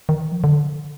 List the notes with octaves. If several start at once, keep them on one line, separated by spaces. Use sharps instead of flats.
D#3
F3
D3